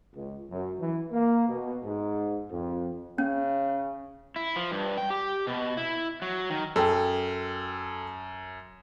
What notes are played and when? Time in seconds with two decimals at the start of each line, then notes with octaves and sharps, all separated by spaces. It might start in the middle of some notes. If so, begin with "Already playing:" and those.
0.14 C#2
0.51 F#2
0.80 E3
1.11 A#3
1.49 B2
1.84 G#2
2.50 F2
3.18 C#3 C#4
4.36 E4
4.56 F3
4.72 G2
4.98 G5
5.10 G4
5.47 B2
5.77 E4
6.22 F#3
6.50 D#3
6.76 F#2 A4 G5